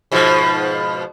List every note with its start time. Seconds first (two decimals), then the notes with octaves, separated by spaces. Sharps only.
0.12 G#2 B2 F3